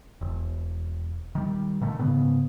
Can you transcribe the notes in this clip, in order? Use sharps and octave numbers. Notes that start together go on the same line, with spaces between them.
E1
D#3 G3
A#2 D#3 A3
G#2 C#3 B3